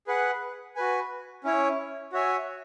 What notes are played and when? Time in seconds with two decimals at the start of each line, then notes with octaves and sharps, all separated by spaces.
0.07 G#4 B4 F#5
0.76 F#4 B4 G#5
1.44 C#4 E4 C#5
2.12 F#4 C#5 E5 G#5